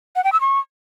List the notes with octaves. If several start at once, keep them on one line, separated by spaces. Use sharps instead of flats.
F#5
G5
E6
C#6